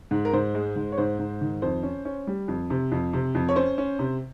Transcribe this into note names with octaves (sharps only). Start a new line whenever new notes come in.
G#2
A#4
G#2 C5
G#3
G#2
C#5
G#2 C5
G#2
D#3
F2 C5
C#4
C#4
G3
F2
C3
F2
C3
F2
C#5
C#4 C5
C#4
C3